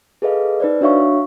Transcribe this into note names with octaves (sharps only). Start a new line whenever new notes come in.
G#4 A4 B4 D#5 F5
D#4 B4 C5 D5
D4 F#4 C#5 E5 F5 C#6